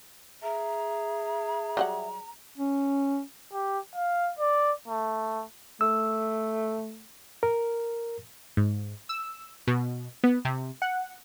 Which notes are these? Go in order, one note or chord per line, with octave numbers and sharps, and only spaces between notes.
G#4 E5 A#5
F#3 G3 F#5
C#4
G4
F5
D5
A3
A3 E6
A#4
G#2
E6
B2
B3
C3
F#5